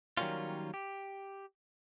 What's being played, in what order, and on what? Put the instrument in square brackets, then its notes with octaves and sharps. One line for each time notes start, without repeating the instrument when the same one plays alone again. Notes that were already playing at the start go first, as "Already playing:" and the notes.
[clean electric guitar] D#3 F#3 G3 A#3 C#4 F4
G4